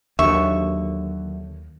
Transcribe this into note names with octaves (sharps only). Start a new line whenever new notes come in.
D#2 D3 F#3 E5 C#6